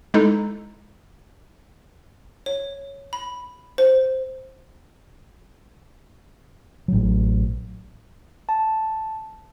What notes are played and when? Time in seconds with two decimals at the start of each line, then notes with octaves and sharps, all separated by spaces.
0.14 G#3 D#4 E4 A4
2.46 C#5
3.13 B5
3.78 C5
6.88 A1 F#3
8.49 A5